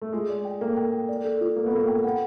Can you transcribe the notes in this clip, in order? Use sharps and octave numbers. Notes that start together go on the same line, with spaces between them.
A3
G#3 F4
D5
G5
A#3 A4
G5
G5
D5
A4
F4
A#3 A4
B3
A#3 A4
G5
B3 F#5